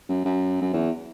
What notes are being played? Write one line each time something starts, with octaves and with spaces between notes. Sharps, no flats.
F#2
F#2
F#2
E2